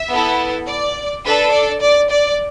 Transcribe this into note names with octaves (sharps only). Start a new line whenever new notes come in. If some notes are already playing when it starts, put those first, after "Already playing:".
Already playing: E5
B3 E4 A4
D5
D4 A4 B4
D5
D5
D5